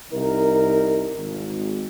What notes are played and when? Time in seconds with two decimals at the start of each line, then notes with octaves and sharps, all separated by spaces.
0.12 C2 D#4 A#4
1.16 G#1